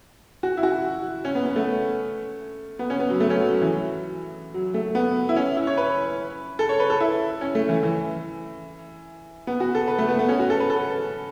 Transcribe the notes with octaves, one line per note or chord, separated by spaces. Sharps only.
F#4
E4
F#4
C#4
B3
B3
A3
B3
C#4
B3
F#3
A3
C#4
F#3
F#3
E3
F#3
A3
B3
E4
C#4
E4
C#5
B4
A4
C#5
B4
A4
E4
C#4
A3
E3
E3
B3
F#4
A4
B4
A3
B3
B3
C#4
F#4
A4
B4
A4